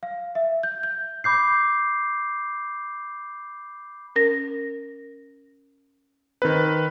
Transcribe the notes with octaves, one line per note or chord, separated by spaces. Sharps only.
F5
E5
G6
G6
B5 D6 G6 C7
C#4 A#4 A#6
D#3 C4 B4